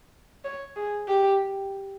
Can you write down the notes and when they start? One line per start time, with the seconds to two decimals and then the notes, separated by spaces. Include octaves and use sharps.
0.45 C#5
0.76 G#4
1.08 G4